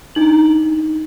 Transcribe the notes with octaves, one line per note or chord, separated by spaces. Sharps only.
D4 D#4 F#7